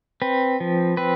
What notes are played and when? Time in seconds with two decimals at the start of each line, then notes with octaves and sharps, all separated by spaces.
0.22 C4 B4
0.60 F3
0.97 C4 B4